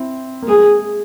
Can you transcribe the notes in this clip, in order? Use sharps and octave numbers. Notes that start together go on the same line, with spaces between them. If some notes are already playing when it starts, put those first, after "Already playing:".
Already playing: C4 E4
A#3
G#3 G#4